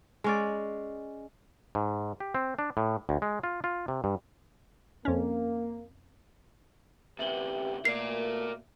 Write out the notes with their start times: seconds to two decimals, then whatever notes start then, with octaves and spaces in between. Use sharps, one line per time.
0.24 G#3 C#4 D5
1.75 G#2
2.20 G4
2.35 C4
2.59 D4
2.77 A2
3.09 D2
3.22 G#3
3.44 F4
3.64 F4
3.88 C3
4.04 G2
5.05 F2 A#3 C#4
7.19 D2 C3 G4 B4 E5 F#7 G7
7.85 B2 A3 A#3 A#4 D5 C7